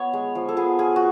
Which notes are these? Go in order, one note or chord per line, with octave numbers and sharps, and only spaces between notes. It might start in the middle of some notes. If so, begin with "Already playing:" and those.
Already playing: B3 C#5
G#3
F3
A4
B3 G#4
F4 G#4
F#4